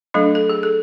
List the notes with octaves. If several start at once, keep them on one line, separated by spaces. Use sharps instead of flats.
F#3 A3 D4 A4
A4
G#4
A4